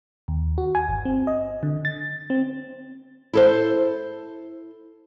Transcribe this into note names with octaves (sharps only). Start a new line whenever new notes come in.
D#2
F#4
G#5
G1
C4
D#5
D3
A6
C4
E4 A4 C5